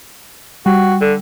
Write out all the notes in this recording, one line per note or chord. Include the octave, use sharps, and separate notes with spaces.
G3 F#4
D3